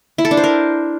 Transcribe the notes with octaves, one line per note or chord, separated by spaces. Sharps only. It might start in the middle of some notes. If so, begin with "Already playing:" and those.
E4
A4
D4
C5
A#4